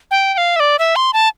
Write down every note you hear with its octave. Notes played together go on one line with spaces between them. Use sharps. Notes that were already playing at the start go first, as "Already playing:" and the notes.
G5
G5
F5
E5
D5
E5
C6
A5